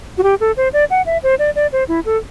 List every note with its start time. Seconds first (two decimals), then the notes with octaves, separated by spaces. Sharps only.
0.18 F#4
0.23 G4
0.40 A4
0.57 C5
0.73 D5
0.90 F#5
1.06 E5
1.23 C5
1.39 D5
1.55 D5
1.72 C5
1.88 E4
2.06 A4